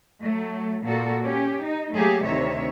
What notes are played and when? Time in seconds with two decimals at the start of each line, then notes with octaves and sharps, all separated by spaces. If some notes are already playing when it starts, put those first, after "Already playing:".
0.22 F#3 A3
0.84 A#2 A#3 F#4 A4
1.24 C#4 G4
1.61 D#4
1.93 F#3 A3 A#3 G4 G#4
2.23 D2 C3 D#3 C4 C#5 E5